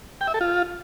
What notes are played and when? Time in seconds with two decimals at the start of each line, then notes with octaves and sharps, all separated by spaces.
0.21 G5
0.27 E5
0.34 A4
0.41 F4